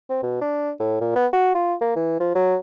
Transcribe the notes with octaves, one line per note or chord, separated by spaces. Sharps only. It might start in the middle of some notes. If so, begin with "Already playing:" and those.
C4
B2
D4
A2
A#2
B3
F#4
F4
A#3
E3
F3
F#3